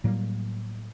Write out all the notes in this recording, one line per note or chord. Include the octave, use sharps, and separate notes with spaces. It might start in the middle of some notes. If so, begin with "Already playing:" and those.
A2 F#3 G3 A#3